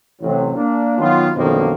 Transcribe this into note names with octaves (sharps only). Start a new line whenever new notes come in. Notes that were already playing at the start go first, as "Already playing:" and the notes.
A1 C3 F#3
A#3 D4
D#3 F#3 B3 F4
F#2 B2 D3 D#3 F3 A#3